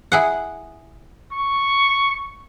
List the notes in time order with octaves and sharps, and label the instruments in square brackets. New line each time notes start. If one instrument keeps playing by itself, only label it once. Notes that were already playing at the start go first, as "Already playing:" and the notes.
[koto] E4 G#4 F#5
[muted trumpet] C#6